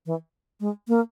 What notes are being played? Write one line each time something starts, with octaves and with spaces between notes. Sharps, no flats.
E3
G#3
A#3